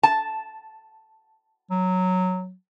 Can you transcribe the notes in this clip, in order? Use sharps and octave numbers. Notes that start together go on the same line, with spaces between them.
A5
F#3